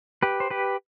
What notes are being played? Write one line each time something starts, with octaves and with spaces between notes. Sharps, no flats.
G4 B4
C5
G4 B4